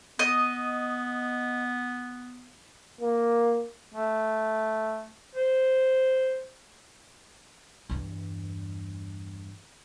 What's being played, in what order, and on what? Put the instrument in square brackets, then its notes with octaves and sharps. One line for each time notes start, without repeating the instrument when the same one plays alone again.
[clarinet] B3 [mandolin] D#5
[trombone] A#3
[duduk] A3
C5
[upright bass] E2 G2